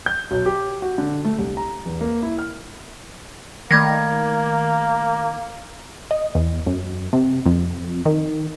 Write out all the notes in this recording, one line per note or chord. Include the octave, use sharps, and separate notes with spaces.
G6
B1
G4
F#4
D3
A3
C2
A#5
E2
A#3
E4
F6
D#3 A3 A#3 G#6 A#6
D#5
E2
F#2
C3
F2
D#3